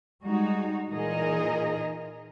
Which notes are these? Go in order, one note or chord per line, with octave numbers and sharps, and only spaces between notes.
G3 G#3 D#4 F#4
A#2 E3 D#4 G#4 A#4 D#5